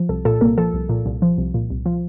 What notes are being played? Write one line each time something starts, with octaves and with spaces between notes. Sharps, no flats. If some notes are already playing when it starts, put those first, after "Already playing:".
Already playing: F3
C2 A4
A#2 A4
C2 A#3 A#4
F3 A4
C2
A#2
C2
F3
C2
A#2
C2
F3